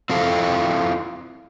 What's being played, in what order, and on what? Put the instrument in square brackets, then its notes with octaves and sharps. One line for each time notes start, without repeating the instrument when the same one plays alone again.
[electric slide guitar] C4 E4 F4 A4